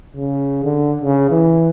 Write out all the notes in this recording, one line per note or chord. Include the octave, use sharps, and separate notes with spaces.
C#3
D3
C#3
E3